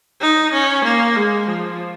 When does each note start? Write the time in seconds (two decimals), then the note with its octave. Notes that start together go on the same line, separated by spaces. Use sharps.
0.21 D#4
0.53 C#4
0.85 A#3
1.16 G#3
1.48 F3